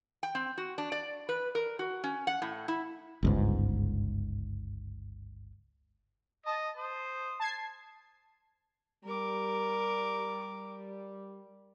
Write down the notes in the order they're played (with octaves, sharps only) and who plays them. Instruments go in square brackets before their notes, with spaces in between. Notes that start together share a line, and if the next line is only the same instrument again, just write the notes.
[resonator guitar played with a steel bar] G5
C4
F#4
D4
D5
B4
A#4
F#4
C#4
F#5
A2
E4
[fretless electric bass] G1 C#2 G#2
[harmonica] D#5 [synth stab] A5
[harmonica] C5 D#6
[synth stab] A5 G#6 C7
[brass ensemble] G3 [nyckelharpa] A#4 D6